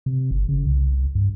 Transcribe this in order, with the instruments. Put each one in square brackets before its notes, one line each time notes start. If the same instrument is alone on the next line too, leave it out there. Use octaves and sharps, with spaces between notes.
[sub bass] C3
G1
C#3
C2
G2